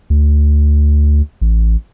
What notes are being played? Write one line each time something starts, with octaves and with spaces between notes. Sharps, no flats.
D2
A1